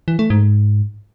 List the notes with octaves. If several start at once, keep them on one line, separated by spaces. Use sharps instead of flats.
E3
A3
G#2